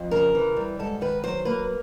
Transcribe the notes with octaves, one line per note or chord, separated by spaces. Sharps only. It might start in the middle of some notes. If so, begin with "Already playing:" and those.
Already playing: F2
C#3 A#4
E3
G3
G#2 A4
D#3 B4
F#3 C5
A#3 B4